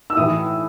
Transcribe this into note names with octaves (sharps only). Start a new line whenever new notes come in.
E6
A2 E3 D#6